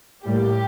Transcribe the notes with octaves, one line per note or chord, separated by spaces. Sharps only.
A2 G3 A#3 G4